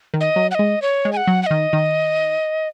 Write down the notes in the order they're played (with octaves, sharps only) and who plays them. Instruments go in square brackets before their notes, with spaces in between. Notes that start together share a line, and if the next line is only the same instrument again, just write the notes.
[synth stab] D#3
[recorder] D#5
[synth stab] F#3
[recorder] F#5
[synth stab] G#3 [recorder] D#5
[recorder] C#5
[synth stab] G#3
[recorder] G#5
F#5
[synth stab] F#3
[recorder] F#5
[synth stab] D#3 [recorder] D#5
[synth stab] D#3